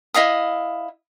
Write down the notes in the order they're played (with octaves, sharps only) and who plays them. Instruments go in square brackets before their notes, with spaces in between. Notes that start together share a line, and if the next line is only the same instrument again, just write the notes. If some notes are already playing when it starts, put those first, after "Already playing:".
[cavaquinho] E4 D#5 F5 D#6